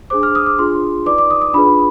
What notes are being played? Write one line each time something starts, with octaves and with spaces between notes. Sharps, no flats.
D4 G#4 C5 D6
F6
D#6
D6
D4 F4 G#4 C6
D#4 B4 D5 D6
D6
D#6
D#6
D4 F4 G#4 B4 B5